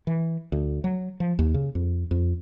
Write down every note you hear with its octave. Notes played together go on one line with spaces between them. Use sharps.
E3
D2
F#3
F3
D#2
C#3
F2
F2